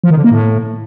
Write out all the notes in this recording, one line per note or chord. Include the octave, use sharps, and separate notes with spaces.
F3
D#3
D3
A#3
A2